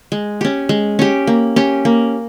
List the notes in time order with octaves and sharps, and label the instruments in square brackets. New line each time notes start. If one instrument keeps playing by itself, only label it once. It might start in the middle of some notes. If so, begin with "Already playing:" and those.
[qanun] G#3
C#4 G4
G#3
C#4 G4
A#3
C#4 G4
A#3